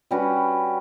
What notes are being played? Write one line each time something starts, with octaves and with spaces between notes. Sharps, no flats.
G3 C#4 F#4 B4